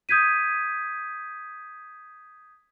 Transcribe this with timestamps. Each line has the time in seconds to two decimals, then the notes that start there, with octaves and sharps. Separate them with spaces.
0.09 D#6 G6 G#6 B6 D#7